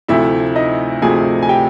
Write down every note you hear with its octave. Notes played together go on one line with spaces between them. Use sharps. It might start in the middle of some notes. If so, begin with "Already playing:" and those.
D2 C3 F3 A3 E4 E5
D#4 D#5
D2 C3 F3 A3 G#4 G#5
G#5
G4 G5